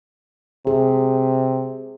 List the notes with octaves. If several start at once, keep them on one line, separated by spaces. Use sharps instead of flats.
C3 G#4